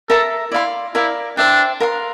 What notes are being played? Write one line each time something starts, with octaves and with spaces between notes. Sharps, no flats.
A4 A#4 E5 A#5
E4 D5 F5 C6
E4 A#4 D5 F5
D4 C5 E5 G5
A#4 F5 C6